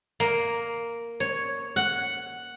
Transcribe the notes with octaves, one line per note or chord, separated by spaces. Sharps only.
A#3
C#5
F#5